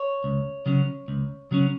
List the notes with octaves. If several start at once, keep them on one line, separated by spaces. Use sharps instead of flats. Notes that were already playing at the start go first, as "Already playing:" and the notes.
Already playing: C#5
C#2
C#3 F#3 C#4
C#2
C#3 F#3 C#4